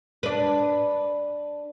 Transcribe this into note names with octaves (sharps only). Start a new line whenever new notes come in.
D4 B4